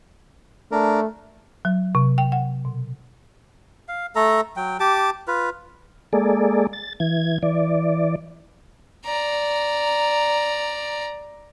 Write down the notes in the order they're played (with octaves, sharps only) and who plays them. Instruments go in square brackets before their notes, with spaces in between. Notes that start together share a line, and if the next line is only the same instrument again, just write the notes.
[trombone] A3 [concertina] D4 A#4
[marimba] F#3
C3
G5
F#5
B2
[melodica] F5
A3 A4 A#5
F#3 G5
G4 A5 D6
F4 B4
[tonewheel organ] G#3 A#3 G#4 A4 D5
A6
E3 G#6
E3 D5
[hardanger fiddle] D5 A#5